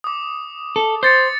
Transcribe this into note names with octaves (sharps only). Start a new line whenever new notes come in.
D6 D#6
A4
C5 D#6 A6 C#7